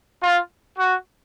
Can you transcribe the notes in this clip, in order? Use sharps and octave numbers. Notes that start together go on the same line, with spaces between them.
F4
F#4